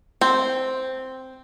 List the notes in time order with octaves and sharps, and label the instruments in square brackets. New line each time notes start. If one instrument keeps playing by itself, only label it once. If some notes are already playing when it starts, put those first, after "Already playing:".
[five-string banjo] C4